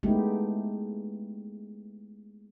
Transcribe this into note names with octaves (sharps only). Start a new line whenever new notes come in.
G#3 A3 B3 D#4 E4 G4